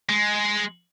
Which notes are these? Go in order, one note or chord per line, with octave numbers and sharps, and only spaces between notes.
G#3